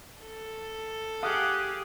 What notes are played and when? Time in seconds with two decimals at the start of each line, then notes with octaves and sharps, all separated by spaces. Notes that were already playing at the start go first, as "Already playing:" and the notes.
0.21 A4
1.23 G4 G#4 F5 F#5 D#6